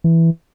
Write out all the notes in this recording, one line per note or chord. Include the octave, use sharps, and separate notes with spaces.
E3